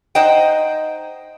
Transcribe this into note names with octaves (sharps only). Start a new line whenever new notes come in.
D#4 C5 D#5 F#5 G5